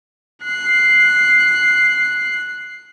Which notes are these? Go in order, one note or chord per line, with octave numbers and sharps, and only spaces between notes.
F#6 C7